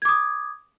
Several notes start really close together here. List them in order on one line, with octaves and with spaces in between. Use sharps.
G#6 D6 D#6